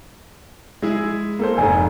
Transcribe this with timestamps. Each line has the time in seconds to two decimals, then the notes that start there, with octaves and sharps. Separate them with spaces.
0.82 G#3 E4 G#4
1.39 A#3 A4 C5
1.58 F1 G#2 G#5